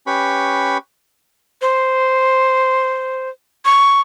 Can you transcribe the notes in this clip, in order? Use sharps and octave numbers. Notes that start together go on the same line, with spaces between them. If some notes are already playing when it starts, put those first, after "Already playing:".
C#4 G4 B4 B5 C#6
C5
C#6